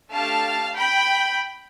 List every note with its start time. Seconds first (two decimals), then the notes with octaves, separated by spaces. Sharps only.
0.11 A3 D4 G4 F5 A5
0.76 G5 B5